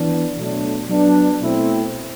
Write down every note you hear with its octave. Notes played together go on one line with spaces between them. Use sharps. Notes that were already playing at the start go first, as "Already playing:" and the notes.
Already playing: E3 B3 D4
B2 F#3 A3 D4
F#3 B3 D4
B2 A3 C4 E4